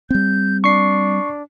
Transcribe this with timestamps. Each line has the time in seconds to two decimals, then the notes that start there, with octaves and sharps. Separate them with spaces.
0.10 G3 C4 G6
0.64 D4 C#6 C7